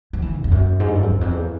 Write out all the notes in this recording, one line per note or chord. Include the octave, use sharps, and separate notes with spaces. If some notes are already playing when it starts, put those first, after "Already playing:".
F3
E3
A#2
F2
F#2
G#2
G2
F#2
F2
E2
F2
E2